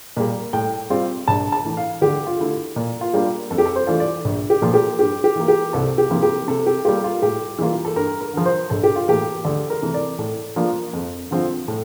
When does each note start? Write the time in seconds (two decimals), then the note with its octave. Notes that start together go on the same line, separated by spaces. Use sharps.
0.17 A#2 G3
0.53 A2 G5
0.90 G3 C4 F4
1.28 A#1 A5
1.52 A5
1.65 A2 E3
1.77 F5
2.01 D2 G4
2.27 F4
2.40 D3 A3 E4
2.76 A#2
3.01 F4
3.14 G3 A#3 D4 F4
3.50 F2 A4
3.58 G4
3.66 A4
3.76 C5
3.87 E3 A3 D4 F4
4.00 D5
4.25 A#1
4.50 G4
4.62 A#2 F3 A3
4.74 G4
4.99 G2 G4
5.24 G4
5.36 E3 A#3
5.48 G4
5.73 C2 A4
5.98 G4
6.10 C3 F3 A#3 E4
6.23 G4
6.48 C3 A4
6.66 G4
6.85 G3 A#3 F4 G4
7.04 F4
7.22 A2 G4
7.59 E3 G3 A#3 F4
7.85 A4
7.96 G2 A#4
8.21 A#4
8.33 D3 F3
8.46 C5
8.70 A#1 A4
8.83 G4
8.96 F4
9.08 A2 E3 A#3 G4
9.45 D2 A4
9.70 A#4
9.82 C3 E3 A3
9.94 D5
10.19 A2
10.56 F3 A#3 D4 F4
10.93 F2
11.31 D3 F3 C4 F4
11.68 A2